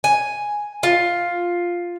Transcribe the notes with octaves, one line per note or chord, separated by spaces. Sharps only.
G#5
F4